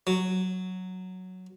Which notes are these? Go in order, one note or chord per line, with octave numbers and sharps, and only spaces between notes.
F#3